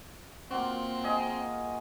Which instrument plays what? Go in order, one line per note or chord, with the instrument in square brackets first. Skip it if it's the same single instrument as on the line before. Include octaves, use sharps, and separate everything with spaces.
[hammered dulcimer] A#3 F4 F#4 [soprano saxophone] C4
[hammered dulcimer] G#4 D#5